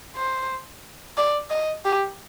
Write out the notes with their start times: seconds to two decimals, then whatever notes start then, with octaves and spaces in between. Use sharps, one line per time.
0.16 C5
1.17 D5
1.50 D#5
1.85 G4